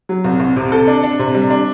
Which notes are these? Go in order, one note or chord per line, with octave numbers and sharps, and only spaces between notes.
F#3
C2
C2
C3
A4
D4
D4
C3
G3
D4